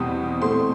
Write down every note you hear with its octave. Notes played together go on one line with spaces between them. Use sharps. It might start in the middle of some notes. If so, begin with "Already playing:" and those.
Already playing: E2 B2 G3 C4 D#6
B2 A3 C4 C6